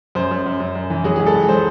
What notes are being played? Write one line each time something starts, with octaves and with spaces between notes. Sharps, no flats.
F#2 C5
F#2
F#2
F#2
F#2
E3
F#3 G#4
C#2 G#4
A4
C#2
F#3 C5